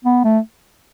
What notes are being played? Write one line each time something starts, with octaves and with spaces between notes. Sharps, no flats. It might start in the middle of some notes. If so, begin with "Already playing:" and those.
B3
A3